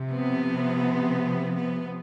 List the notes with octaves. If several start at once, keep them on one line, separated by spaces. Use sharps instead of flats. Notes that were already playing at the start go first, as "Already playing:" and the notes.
Already playing: C3 F3
B3
B3